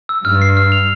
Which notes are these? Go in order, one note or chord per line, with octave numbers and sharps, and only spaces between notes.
E6
G2 F6
C7
F6
F7